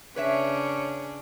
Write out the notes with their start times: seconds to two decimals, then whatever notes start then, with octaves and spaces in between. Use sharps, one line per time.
0.16 C#3 C#4 D4 B4 C#5 E5